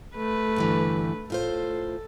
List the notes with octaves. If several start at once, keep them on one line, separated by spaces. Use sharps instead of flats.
A3 B4
G2 D3 E3
A2 F4 A4 C5